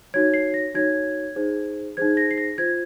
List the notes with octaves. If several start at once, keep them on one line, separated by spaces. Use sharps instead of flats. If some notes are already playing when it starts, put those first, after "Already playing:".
D#4 F#4 C#5 G#6
C7
A#6
D#4 F#4 C#5 G#6
D#4 G#4 C5
D#4 G#4 C5 G#6
A#6
C7
A#6
F4 C5 G#6